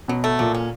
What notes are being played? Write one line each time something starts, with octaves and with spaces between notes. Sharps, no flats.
B2 F#3
A3
A#2 F#3
C#4